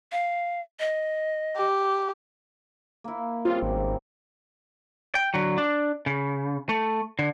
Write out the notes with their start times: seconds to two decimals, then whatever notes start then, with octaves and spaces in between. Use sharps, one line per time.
0.12 F5
0.80 D#5
1.56 G4
3.04 A#3 E4
3.45 C#3 G3 C4 F4
3.63 G#1
5.15 G5
5.34 D3 F#3
5.58 D4
6.06 C#3
6.69 A3
7.19 D3